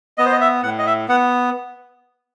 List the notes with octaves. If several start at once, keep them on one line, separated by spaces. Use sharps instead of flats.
B3 D#5
C5
D#5
E5
A2 F#5
D#5
E5
B3 F#5